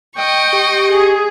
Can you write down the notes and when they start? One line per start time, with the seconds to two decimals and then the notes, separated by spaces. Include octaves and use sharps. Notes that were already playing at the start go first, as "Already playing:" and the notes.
0.17 D#5 G5 C#6
0.53 G4
0.92 G#4